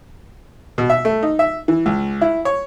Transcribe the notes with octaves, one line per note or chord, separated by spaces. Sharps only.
B2
E5
A3
D#4
E5
E3
C#2
E4
C#5